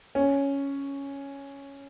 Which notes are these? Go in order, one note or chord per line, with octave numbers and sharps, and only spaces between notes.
C#4